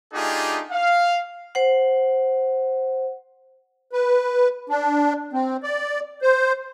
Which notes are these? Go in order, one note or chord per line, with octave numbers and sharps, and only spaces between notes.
A3 D4 D#4 F4 G4 G#4
F5
C5 F#5
B4
D4
C4
D5
C5